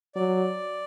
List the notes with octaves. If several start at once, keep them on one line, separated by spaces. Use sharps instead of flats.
F#3 D5